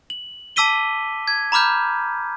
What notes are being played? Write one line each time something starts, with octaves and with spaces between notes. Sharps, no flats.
F#7
A5 D6 E6 B6 D#7 G7
G#6
A#5 B5 D6 F6 G6